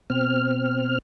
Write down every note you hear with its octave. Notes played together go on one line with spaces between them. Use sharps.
B2 C4 F6